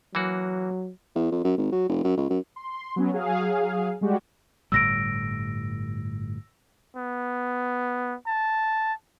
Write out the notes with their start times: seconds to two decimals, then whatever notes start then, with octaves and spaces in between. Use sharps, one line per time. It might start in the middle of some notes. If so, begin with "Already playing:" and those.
0.15 E3 F#3 A#3 F#4
1.16 E2
1.32 F2
1.44 F#2
1.57 G#1
1.72 F#3
1.89 F1
2.04 F#2
2.17 C#2
2.30 F#2
2.56 C6
2.96 F#3 B3 C#4
3.12 F#3 G#4 F5
4.01 G3 G#3 F#4 G4
4.72 G1 A2 G3 E6 A#6 D7
6.97 B3
8.27 A5